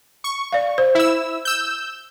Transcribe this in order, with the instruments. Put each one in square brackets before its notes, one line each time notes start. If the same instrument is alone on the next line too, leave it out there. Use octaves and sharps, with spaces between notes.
[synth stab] C#6
[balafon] D5 F5
C5
[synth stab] E4 E6
E6 G6